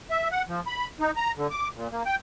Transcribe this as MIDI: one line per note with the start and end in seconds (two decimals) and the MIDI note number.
0.11 0.28 76
0.32 0.42 78
0.49 0.61 53
0.67 0.87 83
1.00 1.11 63
1.16 1.32 82
1.37 1.47 50
1.51 1.68 86
1.76 1.88 46
1.92 2.03 58
2.06 2.16 79